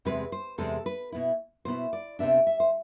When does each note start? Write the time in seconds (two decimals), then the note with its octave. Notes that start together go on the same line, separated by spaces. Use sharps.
0.05 E2 C3 G#3 C4 B4
0.32 C5
0.58 E2 C3 G#3 C4 A4
0.86 B4
1.12 B2 B3 E4
1.65 B2 B3 E4 C5
1.93 D5
2.19 D2 C3 E3 B3 D4 E5
2.47 E5
2.60 C5